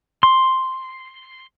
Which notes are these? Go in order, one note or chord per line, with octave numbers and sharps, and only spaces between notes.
C6